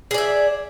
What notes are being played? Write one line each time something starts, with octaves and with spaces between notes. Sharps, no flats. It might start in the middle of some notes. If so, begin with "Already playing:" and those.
G#4 D5 E5